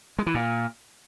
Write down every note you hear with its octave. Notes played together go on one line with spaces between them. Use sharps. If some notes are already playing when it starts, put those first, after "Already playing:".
G#3
E3
A#2